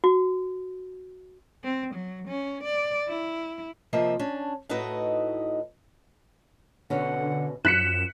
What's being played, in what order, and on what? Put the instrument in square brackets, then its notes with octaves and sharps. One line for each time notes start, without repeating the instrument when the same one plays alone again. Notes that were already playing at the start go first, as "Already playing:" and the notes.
[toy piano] F#4
[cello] C4
F#3
C#4
D5
E4
[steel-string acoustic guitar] C3 F3 A#3 C4 D#5 E5
C#4 D4
A2 D#4 E4 F#4 B4 D#5
[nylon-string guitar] B2 C#4 [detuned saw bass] D3 [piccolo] F#5
[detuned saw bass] F#2 [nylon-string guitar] F3 [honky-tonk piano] F#6 B6 C#7 [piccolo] E7